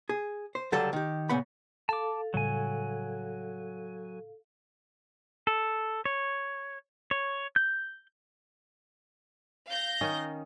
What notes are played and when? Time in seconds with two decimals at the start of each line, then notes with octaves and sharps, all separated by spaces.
0.09 G#4
0.55 C5
0.72 C#2 D3 F#3 G3 A4 D5
0.93 D#3 G4
1.29 A#2 C#3 B3 F#5 B5
1.89 A4 F5 A5 D6
2.34 A2 C#3 F#3 G3 G#5
5.47 A4
6.05 C#5
7.11 C#5
7.56 G6
9.67 F5 G6 A#6
10.01 D#3 C#4 D#4